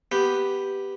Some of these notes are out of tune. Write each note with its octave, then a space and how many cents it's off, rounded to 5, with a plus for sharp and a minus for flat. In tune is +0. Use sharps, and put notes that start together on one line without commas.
B3 +0 G4 +0